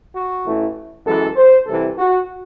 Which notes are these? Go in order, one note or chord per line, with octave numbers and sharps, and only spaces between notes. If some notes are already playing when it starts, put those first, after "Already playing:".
F#4
A1 A2 E3 A3
F#2 E3 G#3 A4
C5
C2 C3 E3 A4
F#4